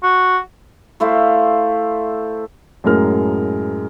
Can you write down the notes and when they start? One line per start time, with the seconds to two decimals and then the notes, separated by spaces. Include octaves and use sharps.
0.03 F#4
1.00 A3 E4 C5 F5
2.84 F#2 A2 G#3 A#4 F6